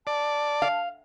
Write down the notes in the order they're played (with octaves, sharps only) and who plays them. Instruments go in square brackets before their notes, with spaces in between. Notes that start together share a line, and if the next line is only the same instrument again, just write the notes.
[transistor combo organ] D5 [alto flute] A5
[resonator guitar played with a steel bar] F5